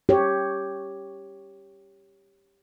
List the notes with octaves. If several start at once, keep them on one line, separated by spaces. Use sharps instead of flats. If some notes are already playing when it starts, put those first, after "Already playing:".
G4 C#5